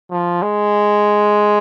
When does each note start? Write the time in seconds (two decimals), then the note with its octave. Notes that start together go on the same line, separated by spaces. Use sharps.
0.11 F3
0.42 G#3